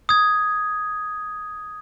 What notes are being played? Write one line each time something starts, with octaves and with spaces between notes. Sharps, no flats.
D#6 G#6